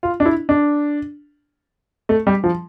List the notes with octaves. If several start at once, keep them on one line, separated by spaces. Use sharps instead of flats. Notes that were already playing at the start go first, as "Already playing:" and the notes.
F4
D4
E4
D4
A3
G3
F3